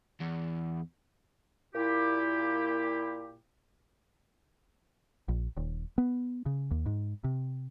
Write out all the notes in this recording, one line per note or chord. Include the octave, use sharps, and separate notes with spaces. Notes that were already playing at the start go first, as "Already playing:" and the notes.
E2
A#2 E4 G4
A#1
D#1
B3
C#3
D#2
G#2
C3